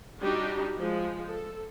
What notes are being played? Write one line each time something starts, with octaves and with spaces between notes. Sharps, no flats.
G3 D4 D#4 F#4 G4
F3 G#3
A4